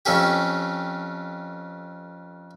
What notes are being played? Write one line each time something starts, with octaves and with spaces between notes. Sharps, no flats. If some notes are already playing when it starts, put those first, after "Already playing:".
F2 A3 C#4 G4